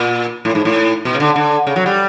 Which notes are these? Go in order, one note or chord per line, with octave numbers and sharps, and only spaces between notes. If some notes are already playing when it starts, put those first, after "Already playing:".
Already playing: A#2
A2
G#2
A2
B2
C#3
D3
D3
C#3
F#3
G3